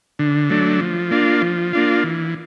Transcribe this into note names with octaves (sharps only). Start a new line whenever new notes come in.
D3
F#3 A3 D4
F3
A#3 D4 F4
F3
A#3 D4 F4
E3